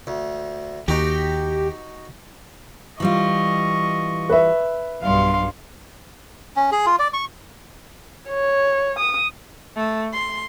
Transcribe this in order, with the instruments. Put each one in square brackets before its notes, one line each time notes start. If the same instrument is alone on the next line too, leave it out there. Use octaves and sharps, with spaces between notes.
[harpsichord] D2
[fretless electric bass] D#2 [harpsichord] D#4 F#4 A#5 [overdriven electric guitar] G4
[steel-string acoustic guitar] E3 G3 F4 [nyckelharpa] D#5 C#6
[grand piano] B4 E5
[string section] B1 G2 [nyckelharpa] F5 C6
[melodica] C#4
G#4
F4
D5
C#6
[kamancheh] C#5
D#6
[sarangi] A3
C6